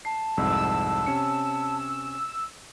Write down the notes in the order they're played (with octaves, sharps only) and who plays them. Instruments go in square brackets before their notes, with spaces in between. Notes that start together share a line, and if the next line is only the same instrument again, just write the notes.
[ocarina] A5 [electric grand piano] C7
[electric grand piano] C2 F2 G#2 [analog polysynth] E6
[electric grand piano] C3 C#4 C#7